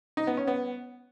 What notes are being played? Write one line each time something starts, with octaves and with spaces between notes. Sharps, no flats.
D#4
B3
C#4
B3